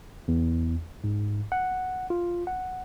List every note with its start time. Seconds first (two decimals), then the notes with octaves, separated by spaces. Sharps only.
0.28 E2
1.04 G#2
1.52 F#5
2.10 F4
2.47 F#5